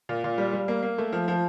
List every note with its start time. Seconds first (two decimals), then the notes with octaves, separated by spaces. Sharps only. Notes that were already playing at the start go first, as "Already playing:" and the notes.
0.09 A#2
0.24 A#2
0.38 G3
0.53 G3
0.68 A#3
0.83 A#3
0.98 A3
1.13 F3
1.28 F3